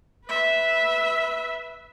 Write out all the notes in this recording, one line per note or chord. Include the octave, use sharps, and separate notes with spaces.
B4 E5